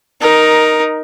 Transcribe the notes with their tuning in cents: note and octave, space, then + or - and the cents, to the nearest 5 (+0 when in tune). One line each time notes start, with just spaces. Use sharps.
D#4 +0 A#4 +10